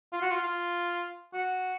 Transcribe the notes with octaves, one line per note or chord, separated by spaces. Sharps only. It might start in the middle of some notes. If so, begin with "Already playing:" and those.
F4
F#4
F4
F4
F#4